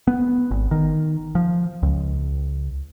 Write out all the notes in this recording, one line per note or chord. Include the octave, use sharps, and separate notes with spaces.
B3
G#1
D#3
F3
C#2